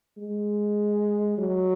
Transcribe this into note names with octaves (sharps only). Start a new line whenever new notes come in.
G#3
F#3